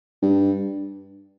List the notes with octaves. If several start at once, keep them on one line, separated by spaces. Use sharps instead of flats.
G2